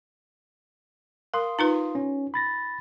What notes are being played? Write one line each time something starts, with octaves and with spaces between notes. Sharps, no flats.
A#4 F5 C6 D#6
D#4 F4 B4
C#4
B5 A6 A#6